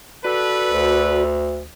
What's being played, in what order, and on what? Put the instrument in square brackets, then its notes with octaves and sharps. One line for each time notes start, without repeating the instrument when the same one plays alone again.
[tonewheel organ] F#4 D5 [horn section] A4 B4
[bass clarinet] D2